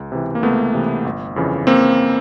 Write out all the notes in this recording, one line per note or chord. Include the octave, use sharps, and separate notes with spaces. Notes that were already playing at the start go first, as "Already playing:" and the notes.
Already playing: C#2
C3 E3
A#3
C#2 A3 B3
C3 E3
G1
F2 C#3 E3
A#3 C4